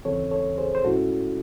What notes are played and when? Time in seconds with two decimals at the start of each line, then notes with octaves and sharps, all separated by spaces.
0.05 D#2 C#3 E3 C4 A4 C#5
0.31 A4 C#5
0.58 G#4 C5
0.75 C5
0.84 A2 G#3 C#4 E4 F#4 A4